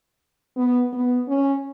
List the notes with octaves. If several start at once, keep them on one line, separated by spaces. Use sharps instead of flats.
B3
B3
C#4